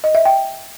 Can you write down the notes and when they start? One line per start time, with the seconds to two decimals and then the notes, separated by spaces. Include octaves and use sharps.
0.04 D#5
0.15 E5
0.25 G5